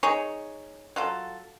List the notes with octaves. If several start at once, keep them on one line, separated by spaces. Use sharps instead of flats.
D#4 G#4 C#5
F#3 F4 A4